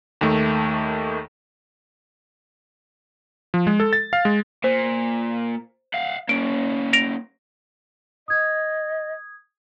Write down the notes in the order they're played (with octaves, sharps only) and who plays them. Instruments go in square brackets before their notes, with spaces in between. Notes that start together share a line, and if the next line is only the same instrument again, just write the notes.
[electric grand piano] D#2 D#3 A3
F3
G#3
A4
A6
F5
G#3
[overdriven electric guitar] A#2 [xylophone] C5
[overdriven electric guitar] F5 F#5
[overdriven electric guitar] A#3 C#4 [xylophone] D7
[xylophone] A#6 D7 F7
[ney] D#5 [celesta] D#6 G#6